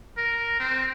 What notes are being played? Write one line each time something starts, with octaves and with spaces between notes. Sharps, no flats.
A#4
C4